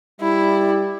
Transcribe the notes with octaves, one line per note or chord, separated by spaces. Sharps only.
G3 E4